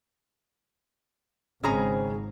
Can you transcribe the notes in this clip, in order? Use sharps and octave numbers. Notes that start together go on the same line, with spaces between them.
G#1 G#2 C#3 G#3 C4 C#4 G#4 A#5